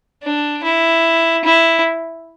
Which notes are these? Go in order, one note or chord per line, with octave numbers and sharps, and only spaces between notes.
D4
E4
E4